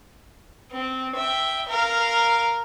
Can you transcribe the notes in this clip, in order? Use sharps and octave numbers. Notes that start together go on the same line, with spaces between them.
C4
E5 G5
A#4 F5